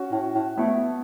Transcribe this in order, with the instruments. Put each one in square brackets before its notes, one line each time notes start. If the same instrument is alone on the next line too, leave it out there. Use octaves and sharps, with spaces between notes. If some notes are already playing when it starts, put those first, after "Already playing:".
Already playing: [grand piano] C#4 F#4
[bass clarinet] A2
A2
[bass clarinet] A3 [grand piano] B3 E4